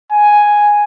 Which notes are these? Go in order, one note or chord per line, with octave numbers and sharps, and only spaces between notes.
G#5